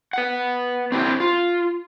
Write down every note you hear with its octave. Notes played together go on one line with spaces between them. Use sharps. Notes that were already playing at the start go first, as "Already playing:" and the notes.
B4 F#5
C4 D4 E4 F#4 G4 C5
F4